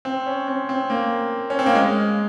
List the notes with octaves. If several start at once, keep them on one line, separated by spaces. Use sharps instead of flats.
C4
C#4
C4
C4
A#3
C#4
C4
A#3
G#3